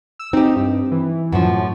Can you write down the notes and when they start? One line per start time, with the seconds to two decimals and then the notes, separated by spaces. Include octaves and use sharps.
0.19 E6
0.33 C4 D#4 G4
0.56 G2
0.92 E3
1.32 F#2 A2 F3